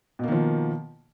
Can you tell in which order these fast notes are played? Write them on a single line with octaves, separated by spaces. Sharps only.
B2 A#3 D#3 F3